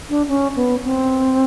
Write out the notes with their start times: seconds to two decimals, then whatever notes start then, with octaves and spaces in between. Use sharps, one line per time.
0.09 D4
0.28 C#4
0.56 B3
0.85 C4